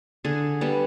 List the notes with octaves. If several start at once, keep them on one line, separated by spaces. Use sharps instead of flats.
D3 G#4
G3 B3